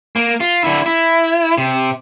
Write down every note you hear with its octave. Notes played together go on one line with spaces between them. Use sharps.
A#3
F4
D3 E4
E4
C3